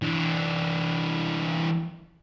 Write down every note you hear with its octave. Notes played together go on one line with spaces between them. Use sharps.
E3 D4